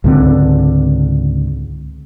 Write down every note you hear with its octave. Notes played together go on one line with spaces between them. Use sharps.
C#2 G#2 D3 C4